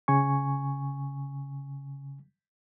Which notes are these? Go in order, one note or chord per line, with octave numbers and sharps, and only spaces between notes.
C#3 G#5 C#6